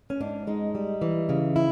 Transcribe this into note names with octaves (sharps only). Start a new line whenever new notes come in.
C#4
G#2 D4
G#3 D#4
G3
E3
C#3
E4